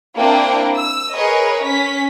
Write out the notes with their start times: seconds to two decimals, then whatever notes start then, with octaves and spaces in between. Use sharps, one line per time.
0.17 A#3 C4 D4 E4 G5
0.74 E6
1.12 G#4 A#4 B4 C#5 D#5
1.62 C#4 B6